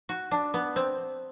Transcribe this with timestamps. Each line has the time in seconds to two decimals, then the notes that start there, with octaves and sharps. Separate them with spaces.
0.09 F#4
0.31 D4
0.54 B3
0.76 C4